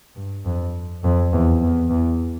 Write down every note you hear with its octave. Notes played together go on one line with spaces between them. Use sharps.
G2
F2
F2
E2
E2
E2